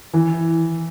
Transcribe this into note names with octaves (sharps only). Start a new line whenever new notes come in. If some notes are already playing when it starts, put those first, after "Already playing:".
E3